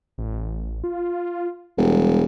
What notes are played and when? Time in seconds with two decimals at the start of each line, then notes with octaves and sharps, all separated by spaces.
0.18 A1
0.84 F4
1.77 E1 G3